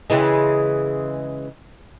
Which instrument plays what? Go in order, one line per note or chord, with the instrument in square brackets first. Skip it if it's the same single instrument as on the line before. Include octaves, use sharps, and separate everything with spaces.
[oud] C#3 E3 G#3